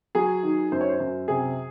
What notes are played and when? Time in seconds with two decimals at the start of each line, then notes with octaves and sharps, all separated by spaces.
0.15 F#3 G#4
0.43 D#3
0.72 F#2 C5
0.81 C#5
0.89 C5
1.00 F#2
1.28 C3 G#4